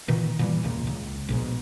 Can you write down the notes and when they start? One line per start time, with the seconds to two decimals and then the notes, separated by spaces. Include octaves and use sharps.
0.08 A#2 D#3 E3
0.39 A#2 E3 G3
0.63 E1 C#2 A#2
0.87 C#2
1.29 A#1 G#2 B2